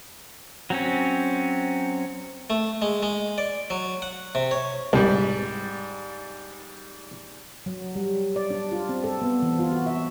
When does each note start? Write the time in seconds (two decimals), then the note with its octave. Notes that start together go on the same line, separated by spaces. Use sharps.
0.70 F#3 C4 C#4
2.50 A3
2.82 G#3
3.03 G#3
3.38 D5
3.70 F#3
4.02 F#5
4.35 C3
4.51 C#5
4.93 C2 G#2 G3
7.66 F#3
7.96 G3
8.36 D5
8.50 D4
8.72 F4
8.89 C4
9.04 A4
9.22 B3
9.43 E3
9.59 F4
9.72 F#4
9.86 E5